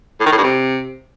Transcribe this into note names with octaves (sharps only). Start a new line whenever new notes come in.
A2
D#3
A2
G2
C3